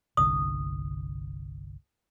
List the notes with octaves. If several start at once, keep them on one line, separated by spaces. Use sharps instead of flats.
G1 C2 D3 D#6